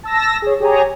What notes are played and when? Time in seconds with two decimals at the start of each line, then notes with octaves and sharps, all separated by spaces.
0.04 A5 E6 A#6
0.42 G#4 C#5
0.60 G4 G#4 C#5 G#5 A#5